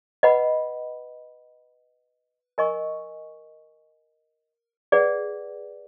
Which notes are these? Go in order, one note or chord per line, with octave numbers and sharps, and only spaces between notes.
B4 D#5 F#5 B5
A#4 D#5 G#5 C#6
G#4 B4 D5 F#5